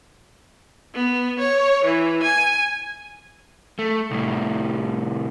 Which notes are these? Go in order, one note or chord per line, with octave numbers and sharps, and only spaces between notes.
B3
C#5
E3
G#5
A3
C2 A2